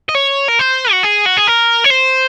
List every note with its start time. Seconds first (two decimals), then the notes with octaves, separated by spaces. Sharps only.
0.09 D#5
0.15 C#5
0.48 A#4
0.59 C5
0.91 F#4
1.03 G#4
1.25 F#4
1.37 G#4
1.47 A#4
1.84 C#5
1.90 C5